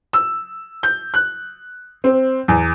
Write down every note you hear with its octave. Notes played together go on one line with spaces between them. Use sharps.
E6
G6
F#6
C4
E2